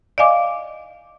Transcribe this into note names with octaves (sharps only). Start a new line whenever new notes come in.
D5 D#5 F5 G#5 D6